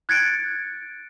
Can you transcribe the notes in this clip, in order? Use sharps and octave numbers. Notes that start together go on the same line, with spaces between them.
F#6 G#6 A6 C#7 D7